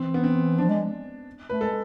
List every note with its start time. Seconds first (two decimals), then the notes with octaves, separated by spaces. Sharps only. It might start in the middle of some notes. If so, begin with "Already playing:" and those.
Already playing: E3 C4
0.14 B3
0.24 C4
0.58 F3 D4
0.69 G#3
1.49 A3 B4
1.61 G#3 A4